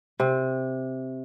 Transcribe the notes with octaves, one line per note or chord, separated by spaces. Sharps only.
C3